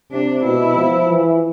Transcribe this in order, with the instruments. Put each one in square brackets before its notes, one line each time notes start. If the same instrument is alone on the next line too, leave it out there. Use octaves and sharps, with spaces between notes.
[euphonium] C3 [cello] D4
[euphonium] B2 [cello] E4
[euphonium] F3
E3